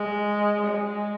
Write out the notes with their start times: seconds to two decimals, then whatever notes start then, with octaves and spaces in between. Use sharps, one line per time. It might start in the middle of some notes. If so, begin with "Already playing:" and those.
Already playing: G#3
0.66 G#3